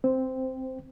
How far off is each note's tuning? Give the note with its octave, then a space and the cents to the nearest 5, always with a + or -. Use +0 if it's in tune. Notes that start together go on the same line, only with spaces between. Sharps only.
C4 +0 C5 -10 G5 +0